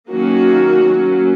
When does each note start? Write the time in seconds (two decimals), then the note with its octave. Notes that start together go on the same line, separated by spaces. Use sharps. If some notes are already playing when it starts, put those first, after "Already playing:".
0.10 D#3 F#3 A#3 C#4 F#4
0.84 F#3 A#3 C#4